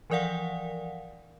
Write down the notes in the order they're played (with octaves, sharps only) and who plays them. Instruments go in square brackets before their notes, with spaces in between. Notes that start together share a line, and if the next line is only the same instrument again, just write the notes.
[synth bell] E3 F3 A#4 D5 F5 F#5